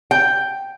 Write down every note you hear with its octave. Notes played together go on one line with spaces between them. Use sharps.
G5